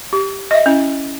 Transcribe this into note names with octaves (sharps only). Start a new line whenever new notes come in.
G4
D#5 E5
C#4 E4